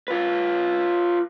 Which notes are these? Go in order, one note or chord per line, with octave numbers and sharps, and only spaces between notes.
F4 B4